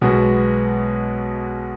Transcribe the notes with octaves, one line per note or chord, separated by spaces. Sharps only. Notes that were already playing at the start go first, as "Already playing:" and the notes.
B1 B2 G#3 B3 F#4